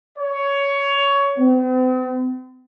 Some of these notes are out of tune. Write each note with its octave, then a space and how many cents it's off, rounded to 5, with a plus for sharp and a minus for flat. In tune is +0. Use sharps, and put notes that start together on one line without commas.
C#5 +15
C4 -45